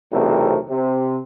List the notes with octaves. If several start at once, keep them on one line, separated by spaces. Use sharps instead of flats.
B1 E2 C3 A3 C4 A#4
C3